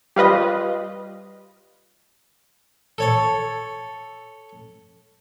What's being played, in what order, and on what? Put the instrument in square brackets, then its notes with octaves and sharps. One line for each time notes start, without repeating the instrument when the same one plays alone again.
[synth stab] G3 F4 B4 D#5
[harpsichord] A4 C#5 A5